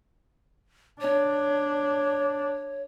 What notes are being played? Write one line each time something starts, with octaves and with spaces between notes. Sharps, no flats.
D4 C#5